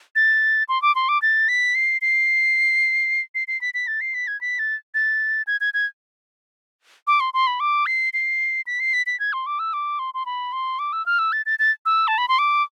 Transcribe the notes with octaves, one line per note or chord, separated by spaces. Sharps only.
A6
C6
D6
C6
D6
A6
B6
C7
C7
C7
C7
B6
B6
A6
C7
B6
G#6
B6
A6
A6
G#6
G#6
G#6
D6
C6
C6
B5
D6
C7
C7
B6
C7
B6
B6
G#6
C6
D6
E6
D6
C6
C6
B5
C6
D6
E6
F6
E6
A6
A6
A6
E6
A5
B5
C6
D6